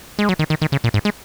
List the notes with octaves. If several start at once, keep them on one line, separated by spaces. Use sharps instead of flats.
G#3
F#3
D#3
D#3
D#3
C#3
A#2
G#2
G#3